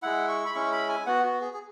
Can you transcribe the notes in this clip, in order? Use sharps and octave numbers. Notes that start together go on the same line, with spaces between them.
G#3 E4 F#5
C#6
B5
G#3 C#4 E4 C#6
B5
G#5
B3 F#4 F#5
F#4
G#4
G#4